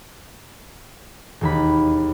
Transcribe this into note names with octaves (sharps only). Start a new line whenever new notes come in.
E1 D#2 B5